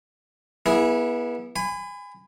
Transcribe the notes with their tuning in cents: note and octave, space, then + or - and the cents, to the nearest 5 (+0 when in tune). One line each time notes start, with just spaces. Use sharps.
B3 -30 E4 -5 G#4 +0
G#5 -20 B5 +30